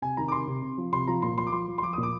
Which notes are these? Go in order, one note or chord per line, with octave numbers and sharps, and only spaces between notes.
C3 G#5
D#3 A#5
D6
C3 C6
C3
C3
F3
C3 C6
F3 A#5
A#2 C6
F3 C6
D6
F3 C6
F3
C6
F3 D6
D#6
A#2
D6